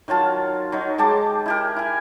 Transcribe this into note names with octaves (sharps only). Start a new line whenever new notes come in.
D#3 F#3 F4 A5
F#3 D#4
G#3 G4 A5 D6
E4 G4 A#4
E4 G#5